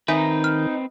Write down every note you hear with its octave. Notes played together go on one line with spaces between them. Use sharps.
D#3 C4 D#4 B4 E5 G#5 B6
F6